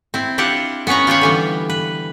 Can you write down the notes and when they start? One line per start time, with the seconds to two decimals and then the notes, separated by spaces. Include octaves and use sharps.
0.14 C4 E4
0.38 D4 E4 F4 G4 F#5
0.87 B3 C#4 B4 C#5 A#5
1.07 F4 G4 B4 C#5
1.21 D3 E3 G3
1.70 B4